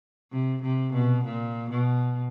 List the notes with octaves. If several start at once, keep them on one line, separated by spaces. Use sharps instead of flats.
C3
C3
B2
A#2
B2